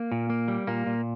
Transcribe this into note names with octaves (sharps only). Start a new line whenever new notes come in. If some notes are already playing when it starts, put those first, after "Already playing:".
Already playing: A#3
A#2
A#3
G3
A#2 A#3
A#2